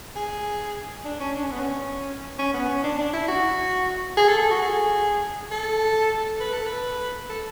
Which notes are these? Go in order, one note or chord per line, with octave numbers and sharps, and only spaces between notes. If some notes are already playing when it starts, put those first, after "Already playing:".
G#4
D4
C#4
D4
C#4
B3
C#4
C#4
B3
C#4
D4
D4
E4
F#4
G#4
A4
A4
F#4
G#4
A4
B4
A4
B4
A4